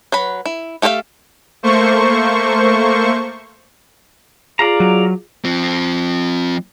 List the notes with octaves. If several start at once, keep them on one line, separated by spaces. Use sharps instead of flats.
F#3 B4 B5
E4
A3 G4 A4 C5 F5
A3 A#3 C5 C#6
F4 G#4 D5 F5 A#5
F#3
F3 C4